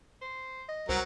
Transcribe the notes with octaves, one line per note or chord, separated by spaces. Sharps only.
C5
D#5
C2 F#3 A#4 C5 F#5